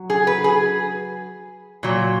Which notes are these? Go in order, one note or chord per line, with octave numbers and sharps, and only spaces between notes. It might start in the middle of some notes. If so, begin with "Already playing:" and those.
Already playing: F#3
G#4
B4
G#4
A#2 F#3